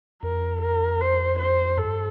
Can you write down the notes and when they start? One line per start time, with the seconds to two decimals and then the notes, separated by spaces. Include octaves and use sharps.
0.22 F2 A#4
0.61 A#4
1.01 C5
1.39 C5
1.77 G2 A4